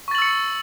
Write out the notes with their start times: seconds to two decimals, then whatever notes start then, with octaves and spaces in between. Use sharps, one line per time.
0.08 C#6
0.11 A6
0.15 F#7
0.18 E6
0.22 C#7